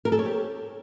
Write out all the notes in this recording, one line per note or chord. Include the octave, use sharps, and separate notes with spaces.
A#4
A4
C#5
G4